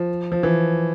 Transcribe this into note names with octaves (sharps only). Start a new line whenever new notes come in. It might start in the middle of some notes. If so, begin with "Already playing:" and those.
Already playing: F3
F3
E3